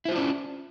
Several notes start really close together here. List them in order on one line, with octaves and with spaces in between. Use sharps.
E4 C5 F4 D4 C#4